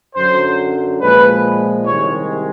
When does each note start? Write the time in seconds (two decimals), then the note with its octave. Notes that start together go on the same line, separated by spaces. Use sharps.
0.16 F#2 D3 F#3 C5
1.01 A#2 F3 G#3 B4
1.86 C2 C3 D#3 G#3 C#5